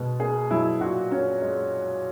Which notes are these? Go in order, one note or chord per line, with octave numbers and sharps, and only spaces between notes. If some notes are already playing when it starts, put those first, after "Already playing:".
Already playing: B2 G#3
A#3 G#4
F#3 E4
A#2 F#4
C#4
G#3